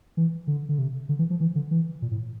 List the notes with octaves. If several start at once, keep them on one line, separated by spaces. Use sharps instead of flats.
E3
D3
D3
C3
D3
E3
F3
E3
D3
E3
A#2
A2